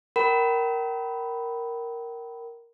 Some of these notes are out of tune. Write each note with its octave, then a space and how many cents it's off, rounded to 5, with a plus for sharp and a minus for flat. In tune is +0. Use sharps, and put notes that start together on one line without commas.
A#4 +0 G5 -35 B5 +0